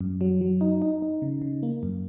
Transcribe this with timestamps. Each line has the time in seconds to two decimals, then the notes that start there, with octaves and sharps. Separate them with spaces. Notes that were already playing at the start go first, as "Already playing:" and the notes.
0.01 F#2
0.21 F#3
0.41 F#3
0.61 D#4
0.82 D#4
1.02 D#4
1.22 C#3
1.42 C#3
1.63 A#3
1.83 F#2